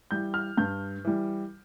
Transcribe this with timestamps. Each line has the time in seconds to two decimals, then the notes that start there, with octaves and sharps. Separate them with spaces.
0.11 E3 G3 G6
0.34 F6
0.57 G2 G6
1.05 E3 G3